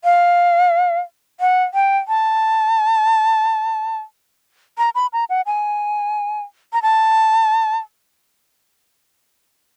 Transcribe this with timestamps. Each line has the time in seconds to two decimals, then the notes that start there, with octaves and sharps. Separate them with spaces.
0.04 F5
1.40 F#5
1.74 G5
2.08 A5
4.78 A#5
4.95 B5
5.13 A#5
5.30 F#5
5.46 G#5
6.73 A#5
6.82 A5